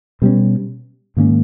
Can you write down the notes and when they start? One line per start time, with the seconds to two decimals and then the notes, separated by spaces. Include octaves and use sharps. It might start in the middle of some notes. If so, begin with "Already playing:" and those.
0.22 B2 G3 C#4
1.17 G#2 D#3 A#3 C#4